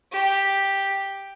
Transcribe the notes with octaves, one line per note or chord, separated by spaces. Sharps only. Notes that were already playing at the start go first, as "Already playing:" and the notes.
G4